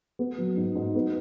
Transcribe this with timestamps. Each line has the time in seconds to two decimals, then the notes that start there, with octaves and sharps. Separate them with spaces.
0.19 B3
0.38 F#3
0.57 G#2
0.75 G#2
0.95 B3